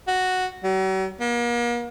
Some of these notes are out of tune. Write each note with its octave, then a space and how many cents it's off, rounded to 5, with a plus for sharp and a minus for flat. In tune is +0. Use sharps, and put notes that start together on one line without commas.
F#4 +0
F#3 +45
A#3 +40